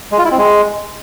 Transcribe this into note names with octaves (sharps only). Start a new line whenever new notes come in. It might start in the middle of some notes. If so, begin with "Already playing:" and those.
G#3
F4
E4
C4
G#3